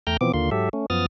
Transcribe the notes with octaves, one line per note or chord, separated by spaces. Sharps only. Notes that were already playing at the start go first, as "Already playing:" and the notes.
E2 A3 G5 A#5 F6 G6
B2 E3 F3 B3 C4 D6
D#2 D3 A#3 F4 C6
G#2 F#3 G4 A4 E5
A3 C#4
F#2 F3 B3 D#6 F6 A6